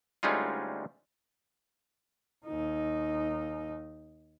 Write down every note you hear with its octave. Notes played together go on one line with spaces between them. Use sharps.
D2 G3 G#3 C#4 D#4 F4
D#2 D#4